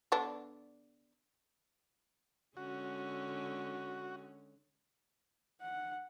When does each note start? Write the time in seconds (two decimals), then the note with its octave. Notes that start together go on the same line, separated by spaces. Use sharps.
0.12 D3 B3 D4
2.57 D3 G#3 C#4 F#4
5.61 F#5